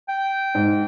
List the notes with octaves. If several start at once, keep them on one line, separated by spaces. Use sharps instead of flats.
G5
G#2